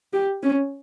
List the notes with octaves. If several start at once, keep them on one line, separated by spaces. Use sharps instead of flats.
G4
C#4